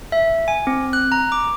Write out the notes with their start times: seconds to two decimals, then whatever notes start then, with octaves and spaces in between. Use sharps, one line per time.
0.12 E5
0.48 G#5
0.67 C4
0.93 F#6
1.12 A#5
1.32 D6